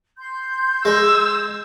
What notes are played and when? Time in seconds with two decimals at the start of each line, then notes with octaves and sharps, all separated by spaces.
0.18 C6 G6
0.85 G#3 E6